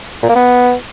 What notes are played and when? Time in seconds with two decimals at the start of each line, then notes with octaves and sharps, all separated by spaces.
0.23 A#2
0.29 A#3
0.35 B3